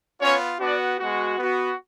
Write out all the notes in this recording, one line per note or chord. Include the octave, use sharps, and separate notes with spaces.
B3 C#4 F4 C#5
B3 D4 F#4 D5
G#3 B3 F#4
B3 F#4